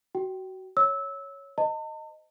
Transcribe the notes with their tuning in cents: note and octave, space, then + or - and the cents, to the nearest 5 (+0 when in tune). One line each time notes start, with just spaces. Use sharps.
F#4 +25 G5 -15
C#5 +0 E6 -20
C5 -20 D#5 +0 A5 +45